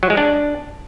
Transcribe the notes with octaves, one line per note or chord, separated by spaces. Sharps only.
F#3
G#3
D4